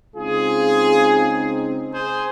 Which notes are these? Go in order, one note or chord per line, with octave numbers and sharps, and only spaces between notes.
C#3 G#3 C4 D#4 F4 G#4
G#4 C5